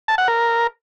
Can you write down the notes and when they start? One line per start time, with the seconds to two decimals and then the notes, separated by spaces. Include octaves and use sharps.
0.08 A5
0.18 F#5
0.28 A#4